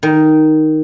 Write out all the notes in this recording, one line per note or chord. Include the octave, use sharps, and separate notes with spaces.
D#3